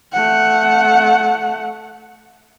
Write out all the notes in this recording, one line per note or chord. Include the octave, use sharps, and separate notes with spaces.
A3 F#5